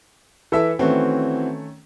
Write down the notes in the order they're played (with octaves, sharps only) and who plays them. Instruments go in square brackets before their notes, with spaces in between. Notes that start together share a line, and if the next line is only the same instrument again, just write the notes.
[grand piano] E3 E5 [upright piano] E4 A4
[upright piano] D#3 A3 C#4 [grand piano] E3 C4 F#4